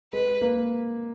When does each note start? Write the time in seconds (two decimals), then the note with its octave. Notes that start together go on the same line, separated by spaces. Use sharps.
0.13 G#3 B4
0.41 A#3